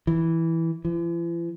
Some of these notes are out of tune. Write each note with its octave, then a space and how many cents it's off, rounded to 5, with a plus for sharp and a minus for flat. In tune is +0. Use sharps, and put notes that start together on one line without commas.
E3 -5
E3 +45